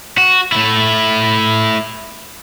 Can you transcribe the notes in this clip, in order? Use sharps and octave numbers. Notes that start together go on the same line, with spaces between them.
F#4
A3 E4